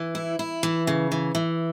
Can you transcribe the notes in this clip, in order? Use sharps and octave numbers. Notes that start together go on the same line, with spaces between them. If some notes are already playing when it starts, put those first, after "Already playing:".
Already playing: E3
E4
E4
E3
C#3
E3
E3